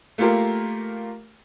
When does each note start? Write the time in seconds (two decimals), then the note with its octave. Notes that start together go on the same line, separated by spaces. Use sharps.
0.18 A3 A#3 F4 G4 A#4